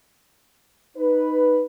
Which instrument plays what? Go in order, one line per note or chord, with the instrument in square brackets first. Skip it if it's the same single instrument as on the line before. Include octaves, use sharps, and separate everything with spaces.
[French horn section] D#4 B4